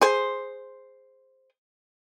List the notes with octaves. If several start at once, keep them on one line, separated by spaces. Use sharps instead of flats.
G#4 C5